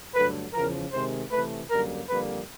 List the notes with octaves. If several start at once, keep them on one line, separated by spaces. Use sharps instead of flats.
G2 D3 F#3 A3 B4
E2 C#3 F3 A#4
C3 D#3 G#3 C5
C3 E3 A3 B4
F#2 D3 G3 A#3 A#4
F2 D3 G3 A#3 B4